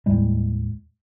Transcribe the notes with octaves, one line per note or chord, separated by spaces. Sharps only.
D#2 A2 G3 G#3